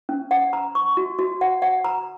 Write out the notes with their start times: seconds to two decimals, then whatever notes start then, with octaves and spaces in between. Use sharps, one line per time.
0.09 C#4
0.31 F#5
0.53 A#5
0.75 C#6
0.97 F#4
1.19 F#4
1.41 F#5
1.62 F#5
1.84 A#5